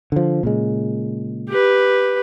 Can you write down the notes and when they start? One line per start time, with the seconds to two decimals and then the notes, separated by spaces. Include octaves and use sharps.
0.12 D3 F3
0.43 A#2 C#3 G#3
1.48 G4 B4